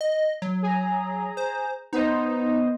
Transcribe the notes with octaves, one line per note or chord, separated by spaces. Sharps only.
D#5
F#3
G#4 A#5
C5
B3 D#4 C5 D#5